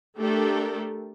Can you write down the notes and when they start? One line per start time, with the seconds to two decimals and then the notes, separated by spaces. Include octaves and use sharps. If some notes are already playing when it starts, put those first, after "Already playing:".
0.16 A3 D4 G4 A4 A#4